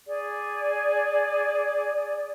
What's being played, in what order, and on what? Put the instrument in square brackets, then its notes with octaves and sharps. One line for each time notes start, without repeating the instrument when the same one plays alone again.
[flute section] G#4 D5